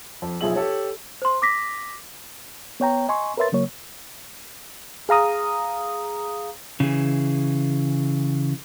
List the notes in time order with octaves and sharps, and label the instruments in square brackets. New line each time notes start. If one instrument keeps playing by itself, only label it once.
[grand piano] F2
B1 F3 G#4 E5 F#7
G4 A4 C#5
[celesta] C5 C6
D6 A#6 B6
[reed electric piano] B3 C#5 G5 A#5
D#5 G#5 C6 C#6
A#4 B4 C#5 E5 C6 A6
C#3 F#3 A#3 C#5
[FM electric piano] G#4 F5 A#5 D#6
[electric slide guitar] C#3 E3 G#4